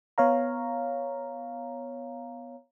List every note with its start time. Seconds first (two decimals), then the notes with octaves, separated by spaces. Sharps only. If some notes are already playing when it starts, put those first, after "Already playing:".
0.18 B3 C#5 F5 A#5